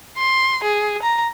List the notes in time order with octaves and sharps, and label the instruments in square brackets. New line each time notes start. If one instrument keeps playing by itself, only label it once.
[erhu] C6
G#4
A#5